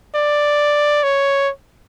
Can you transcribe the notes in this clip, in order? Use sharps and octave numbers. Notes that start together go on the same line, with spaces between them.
D5
C#5